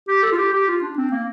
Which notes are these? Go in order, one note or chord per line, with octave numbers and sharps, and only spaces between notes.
G4
A4
F4
G4
G4
F4
D4
C4
A#3